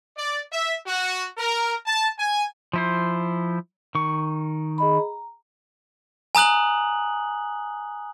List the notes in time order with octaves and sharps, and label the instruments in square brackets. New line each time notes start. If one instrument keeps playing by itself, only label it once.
[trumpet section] D5
E5
F#4
A#4
A5
G#5
[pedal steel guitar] F3 E4 C5
D#3 C#6
[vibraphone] G#4 D#5 B5
A#5
[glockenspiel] G#5 A#5 D#6 F#6 F#7